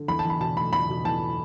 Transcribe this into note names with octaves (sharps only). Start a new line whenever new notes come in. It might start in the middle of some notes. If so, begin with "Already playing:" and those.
Already playing: D3
E2 B5
A5
E2
B5
B2 A5
A3 B5
E2 B5
B2
E2 A5